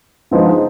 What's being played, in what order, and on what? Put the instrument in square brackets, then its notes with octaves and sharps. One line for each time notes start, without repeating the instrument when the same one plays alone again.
[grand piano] D3 F3 G#3 B3 D#4